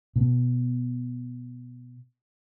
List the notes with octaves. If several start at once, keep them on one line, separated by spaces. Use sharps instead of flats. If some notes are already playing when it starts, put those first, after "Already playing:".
B2 B3